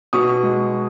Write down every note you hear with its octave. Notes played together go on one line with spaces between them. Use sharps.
B2 C#6 D#6
G#3